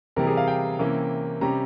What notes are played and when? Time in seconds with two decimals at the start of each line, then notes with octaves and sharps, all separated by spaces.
0.16 C3 E3 G3 A#4
0.27 G#4
0.37 F5
0.48 G5
0.79 C3 E3 A#3 C#4
1.41 C3 G3 C#4 A#5